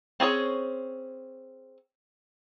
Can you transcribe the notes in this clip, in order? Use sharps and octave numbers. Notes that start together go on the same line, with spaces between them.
C4 C#4 G#4 C#5